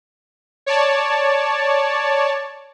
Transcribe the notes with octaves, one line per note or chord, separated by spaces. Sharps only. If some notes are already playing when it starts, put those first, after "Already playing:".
C#5 D5 A5